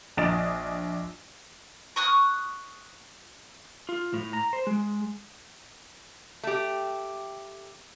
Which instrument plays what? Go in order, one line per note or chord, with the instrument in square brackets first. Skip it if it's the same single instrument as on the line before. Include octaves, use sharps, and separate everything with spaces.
[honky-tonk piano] A#1 D4 D#5 A6 E7
[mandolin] C#6 D#6 F6 F#6
[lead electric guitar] F4
A2
A#5
C5
G#3
[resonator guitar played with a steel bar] A3 G4